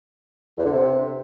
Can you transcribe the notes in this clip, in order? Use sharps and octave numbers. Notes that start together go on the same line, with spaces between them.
E2
D3
C3